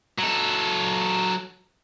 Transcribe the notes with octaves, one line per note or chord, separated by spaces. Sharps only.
F#3 A4